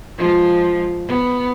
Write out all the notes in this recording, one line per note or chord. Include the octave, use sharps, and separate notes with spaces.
F3 G#3 F4
B3